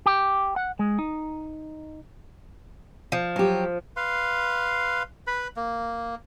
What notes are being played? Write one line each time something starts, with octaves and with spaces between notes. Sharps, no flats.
G4
F#5
G#3
D#4
F3
F#3 G4
B4 F5 C6
B4 B5
A#3